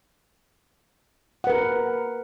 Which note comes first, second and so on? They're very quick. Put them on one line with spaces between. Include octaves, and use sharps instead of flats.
F#5 B4 A#4